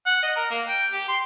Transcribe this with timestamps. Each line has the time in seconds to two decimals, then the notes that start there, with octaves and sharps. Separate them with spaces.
0.06 F#5
0.23 D#5
0.36 A#4
0.50 A#3
0.68 G5
0.92 G4
1.08 C6